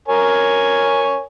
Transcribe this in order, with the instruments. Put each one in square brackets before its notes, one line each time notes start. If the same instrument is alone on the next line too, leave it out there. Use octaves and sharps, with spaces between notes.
[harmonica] A#4 C#5 G#5